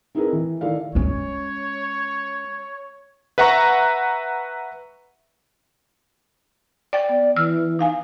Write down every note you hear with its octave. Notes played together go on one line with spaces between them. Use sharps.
C4 D#4 E4 G#4 A#4 B4
E3
D#3 E4 A4 D5 F5
G#3 C#4 C#5
B4 E5 F#5 A#5 C#6
D5 G5 A6
B3 D5
E3 E6 F6
D#4 F5 G#5